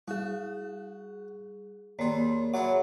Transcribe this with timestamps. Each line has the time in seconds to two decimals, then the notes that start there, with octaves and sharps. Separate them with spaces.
0.08 G3 F#4 G#4
1.99 D#2 G#4 C#5 D5 C6
2.54 F#3 E4 G#4 D5 E5